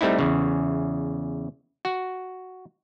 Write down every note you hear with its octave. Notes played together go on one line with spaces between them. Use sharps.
G3 A3 C4 D#4 E4
E2 C#3
F#4